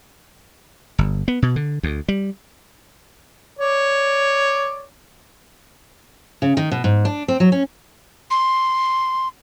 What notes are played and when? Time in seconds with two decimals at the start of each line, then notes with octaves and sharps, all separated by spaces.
0.98 G1
1.28 B3
1.42 B2
1.56 D3
1.83 D2
2.08 G3
3.59 C#5 D5
6.42 C#3
6.57 D#3
6.71 B2
6.84 G#2
7.05 D4
7.28 C4
7.40 F#3
7.52 C#4
8.31 C6